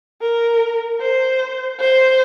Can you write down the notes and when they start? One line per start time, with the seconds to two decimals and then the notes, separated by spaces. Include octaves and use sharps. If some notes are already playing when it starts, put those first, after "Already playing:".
0.22 A#4
1.01 C5
1.80 C5